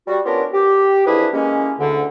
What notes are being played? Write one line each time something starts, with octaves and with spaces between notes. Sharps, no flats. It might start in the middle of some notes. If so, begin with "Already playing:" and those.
G3 F#4
B3 C#4 D4 F4 G4 A#4
G4
F2 E3 D4 E4 G#4 B4
G#3 A#3 C#4
D2 D3